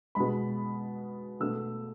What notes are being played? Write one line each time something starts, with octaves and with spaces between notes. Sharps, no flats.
B2 G#3 B5
B2 A3 E6